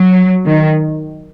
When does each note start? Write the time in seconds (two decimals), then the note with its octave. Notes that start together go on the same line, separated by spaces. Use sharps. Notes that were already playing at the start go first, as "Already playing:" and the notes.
Already playing: F#3
0.46 D#3